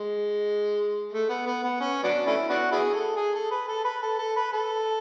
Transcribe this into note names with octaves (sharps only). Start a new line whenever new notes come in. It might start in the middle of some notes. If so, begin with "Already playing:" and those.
Already playing: G#3
A3
B3
B3
B3
C#4
F#3 B3 D4
A3 C#4 E4
B3 D4 F#4
B3 E4 G#4
A4
G#4
A4
B4
A4
B4
A4
A4
B4
A4